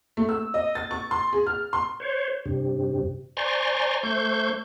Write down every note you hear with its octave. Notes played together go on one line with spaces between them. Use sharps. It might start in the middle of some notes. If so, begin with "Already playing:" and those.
A3
E6
D#5
A6
C#6
C6
G#4
F6
C6
C5 C#5
G2 C3
C5 D5 G#5 A#5 C6 C#6
A3 C5 C#6 G6